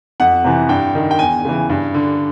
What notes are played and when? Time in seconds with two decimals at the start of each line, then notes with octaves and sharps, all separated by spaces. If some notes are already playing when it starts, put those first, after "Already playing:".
0.20 F2 F#5
0.44 C3 E3
0.69 G2 G5
0.95 D#3
1.11 G5
1.19 E2 G#5
1.45 C#3 E3
1.69 G2
1.94 D3